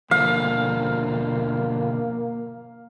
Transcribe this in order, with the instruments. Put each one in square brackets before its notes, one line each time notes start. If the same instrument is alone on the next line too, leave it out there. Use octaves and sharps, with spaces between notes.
[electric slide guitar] B2 D3 F3 [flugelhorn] A#3 [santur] F5